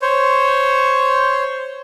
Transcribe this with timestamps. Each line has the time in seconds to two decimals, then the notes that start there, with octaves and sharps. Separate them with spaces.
0.02 C5 C#5